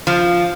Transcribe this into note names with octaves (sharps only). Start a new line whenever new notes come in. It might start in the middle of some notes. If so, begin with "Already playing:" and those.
F3